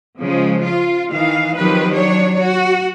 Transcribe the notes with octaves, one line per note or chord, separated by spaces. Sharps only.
C#3 F3 G#3
F4
D#3 E3 F5
D#3 F3 F#3 C4 G4 B4
F#3 D4 C#5
F#4